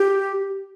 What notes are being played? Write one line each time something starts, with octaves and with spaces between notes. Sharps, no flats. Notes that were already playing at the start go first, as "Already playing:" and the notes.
Already playing: G4